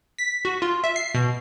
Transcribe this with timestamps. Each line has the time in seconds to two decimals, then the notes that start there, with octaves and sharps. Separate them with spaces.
0.18 B6
0.45 F#4
0.62 F4
0.84 E5
0.96 C7
1.14 B2